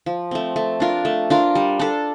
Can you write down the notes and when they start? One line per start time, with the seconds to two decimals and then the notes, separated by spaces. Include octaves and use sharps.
0.06 F3
0.31 A3 C4
0.56 A3
0.80 D4 F4 A#4
1.05 A3
1.30 D4 F4 A#4
1.55 G3
1.80 D4 A4